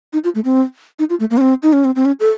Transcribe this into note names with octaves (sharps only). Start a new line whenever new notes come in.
D#4
F4
A3
C4
D#4
F4
A3
A#3
C#4
C4
D#4
C#4
C4
C4
C#4
A4